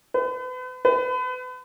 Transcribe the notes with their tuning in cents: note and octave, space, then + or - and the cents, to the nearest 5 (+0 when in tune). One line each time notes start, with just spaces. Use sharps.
B4 +40
B4 +35